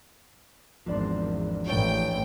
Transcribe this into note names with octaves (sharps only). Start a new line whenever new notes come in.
G#1 E2 F3 D4 A#4 D5 C6
A1 F#4 C#5 G5 A5